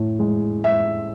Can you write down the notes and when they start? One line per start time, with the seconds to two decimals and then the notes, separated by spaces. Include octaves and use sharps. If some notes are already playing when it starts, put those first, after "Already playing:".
Already playing: A2
0.19 G#3
0.64 G#3 E5